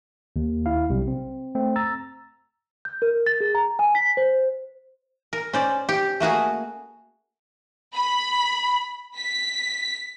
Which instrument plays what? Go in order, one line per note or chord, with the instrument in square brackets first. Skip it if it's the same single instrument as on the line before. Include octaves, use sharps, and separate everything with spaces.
[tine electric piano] D#2
E4 F5
B1 C3 G3
C4
A3 C4
A#5 E6 A6
[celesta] G6
A#4
A6
G#4
A#5
G#5
B6
C5
[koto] A#4
C#4 C5 D5
G4
A3 A#3 F#4 G#4
[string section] B5
B6